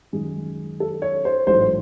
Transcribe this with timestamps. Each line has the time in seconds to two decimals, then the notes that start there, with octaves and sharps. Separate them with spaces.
0.13 F#2 D#3 G#3 G#4
0.80 A4
1.02 C#5
1.25 C5
1.47 A1 G#2 F#3 A3 C5